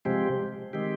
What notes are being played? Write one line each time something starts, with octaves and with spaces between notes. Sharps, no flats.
C3 F3 G#3 C4 G4
D#3 G#3 C4 G4